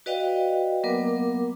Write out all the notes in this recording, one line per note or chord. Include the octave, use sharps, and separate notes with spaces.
F#4 B4 D5 D#5 F5 G5
F#3 A#3 B3 A#4 D6